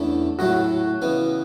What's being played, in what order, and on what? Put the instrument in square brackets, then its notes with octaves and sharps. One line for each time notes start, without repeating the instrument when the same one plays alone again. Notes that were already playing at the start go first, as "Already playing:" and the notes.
Already playing: [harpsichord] E2 D3 A3 C#4 E4
[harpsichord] A2 F#3 A3 E4 [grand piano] F#4
[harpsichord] C#3 E3 B3